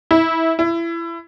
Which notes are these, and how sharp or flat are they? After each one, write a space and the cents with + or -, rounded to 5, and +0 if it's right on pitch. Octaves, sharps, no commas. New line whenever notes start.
E4 -20
E4 +25